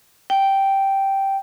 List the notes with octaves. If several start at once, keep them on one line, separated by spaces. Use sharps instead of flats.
G5